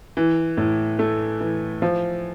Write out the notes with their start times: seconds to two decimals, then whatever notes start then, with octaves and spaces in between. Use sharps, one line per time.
0.17 E3
0.57 A2
0.99 A3
1.40 E3
1.82 F3